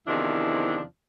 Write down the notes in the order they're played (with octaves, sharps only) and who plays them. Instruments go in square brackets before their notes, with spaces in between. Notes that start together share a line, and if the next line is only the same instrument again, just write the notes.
[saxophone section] E2 C3 D#3 F3 D4 E4